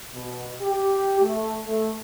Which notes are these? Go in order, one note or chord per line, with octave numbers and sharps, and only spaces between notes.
B2
G4
A3
A3